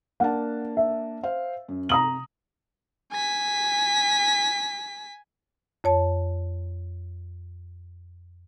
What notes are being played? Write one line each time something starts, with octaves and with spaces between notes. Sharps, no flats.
A#3 D4 F#5 A5
E5
C5 F5
F#2
C3 A#5 D#6 F#7
G#5 B6
F2 C#5 A5